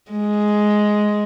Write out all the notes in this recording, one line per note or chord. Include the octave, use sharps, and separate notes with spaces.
G#3